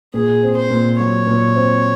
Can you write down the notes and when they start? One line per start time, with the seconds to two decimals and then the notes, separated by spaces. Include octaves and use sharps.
0.14 A#2 G#4
0.43 C4
0.56 C5
0.70 A#2
0.99 F#3 C#5
1.27 A#2
1.56 C4